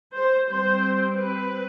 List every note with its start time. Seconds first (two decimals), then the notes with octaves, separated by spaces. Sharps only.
0.15 C5
0.49 G3 C4 C5
1.16 B4